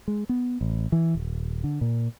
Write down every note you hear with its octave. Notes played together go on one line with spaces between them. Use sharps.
G#3
B3
A1
E3
D#1
D3
A#2